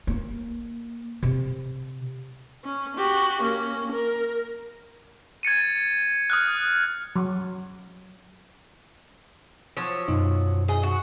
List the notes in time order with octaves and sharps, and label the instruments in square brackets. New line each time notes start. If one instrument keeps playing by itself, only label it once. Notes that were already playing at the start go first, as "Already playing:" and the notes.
[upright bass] A#3
C3
[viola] C#4
F#4 G4
A#3 C#4
A#4
[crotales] G#6 A6 C#7 D#7
D#6 F6 F#6
[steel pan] F#3
[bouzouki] F3 F#3 C#5
[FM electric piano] F#2 B2 D#4
[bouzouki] G#4 D#5
F#4